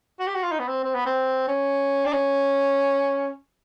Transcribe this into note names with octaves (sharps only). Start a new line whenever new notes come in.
F#4
G4
F#4
F4
D#4
B3
C4
C4
B3
C4
C#4
D4
C#4